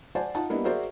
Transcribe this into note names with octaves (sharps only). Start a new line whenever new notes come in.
C5 D5 F#5 G#5 A5
D#4 F4 F#5 A5
G3 A#3 B3 D4 E4 D#5
F#4 G#4 A#4 C5 D5 E5